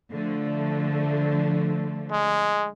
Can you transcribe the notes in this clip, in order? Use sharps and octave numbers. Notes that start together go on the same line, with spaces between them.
D3 F3 A3
G#3